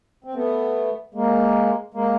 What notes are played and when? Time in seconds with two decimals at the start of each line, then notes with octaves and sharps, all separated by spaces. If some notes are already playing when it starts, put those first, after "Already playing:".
0.24 C4
0.34 A3 B3
1.14 G#3 A#3
1.94 G#3 A#3